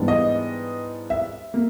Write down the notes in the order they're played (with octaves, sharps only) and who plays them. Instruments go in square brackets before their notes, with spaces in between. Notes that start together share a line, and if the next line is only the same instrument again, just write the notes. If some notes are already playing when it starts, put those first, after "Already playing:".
Already playing: [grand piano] G#2 E3 G3 B3 D4
D#5
E5
A#3